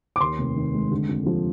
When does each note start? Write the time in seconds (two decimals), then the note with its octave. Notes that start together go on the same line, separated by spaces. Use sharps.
0.16 D6
0.21 D#2 C6
0.38 F1
0.56 D#3
0.74 G#3
0.91 D3
1.09 F2
1.26 F3